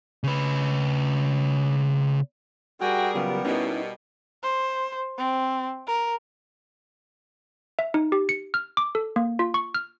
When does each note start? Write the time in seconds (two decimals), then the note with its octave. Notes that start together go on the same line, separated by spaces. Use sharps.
0.24 C#3 B4
2.81 G3 F#4 G#4 A#4 G5
3.15 C#3 F#3 B3 F4
3.45 B2 C#4 D#4 E4
4.43 C5
5.18 C4
5.87 A#4
7.79 E5
7.94 D#4
8.12 G4
8.29 C#7
8.54 F6
8.77 D6
8.95 A4
9.16 A#3
9.39 F4
9.54 C#6
9.75 F6